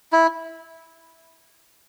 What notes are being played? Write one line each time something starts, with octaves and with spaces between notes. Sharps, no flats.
E4